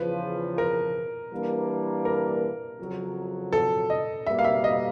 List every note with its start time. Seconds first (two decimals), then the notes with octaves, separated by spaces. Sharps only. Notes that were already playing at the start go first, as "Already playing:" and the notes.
Already playing: E2 C#3 F3 B4
0.58 A#4
1.32 E3 G3 A#3 D4
2.05 A#4
2.79 F2 C#3 F#3
3.53 A4
3.90 D#5
4.26 B2 G3 A#3 E5
4.39 F5
4.44 E5
4.64 D#5